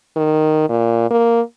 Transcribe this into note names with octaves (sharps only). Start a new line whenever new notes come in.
D#3
A#2
A#3